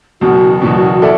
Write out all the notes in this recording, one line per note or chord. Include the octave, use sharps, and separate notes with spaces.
F#1 E2 B2 F#4
F#1 E2 B2
E4 A4 D5